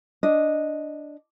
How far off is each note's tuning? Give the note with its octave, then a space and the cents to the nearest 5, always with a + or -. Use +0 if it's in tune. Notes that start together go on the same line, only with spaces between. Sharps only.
D4 +0 D#5 +0